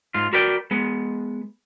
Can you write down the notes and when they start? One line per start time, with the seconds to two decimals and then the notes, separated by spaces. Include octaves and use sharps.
0.14 G#2 F4
0.33 F#4 A#4 B4 D5 G5
0.71 G#3 B3